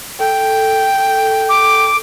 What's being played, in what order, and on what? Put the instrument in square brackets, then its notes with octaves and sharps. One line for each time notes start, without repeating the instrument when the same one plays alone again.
[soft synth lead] A4 [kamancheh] G5
[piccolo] D6